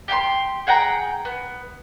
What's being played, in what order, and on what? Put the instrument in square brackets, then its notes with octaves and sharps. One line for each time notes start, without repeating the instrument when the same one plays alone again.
[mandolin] G4 G5 G#5 C6
G#4 F#5 G5 A#5
B3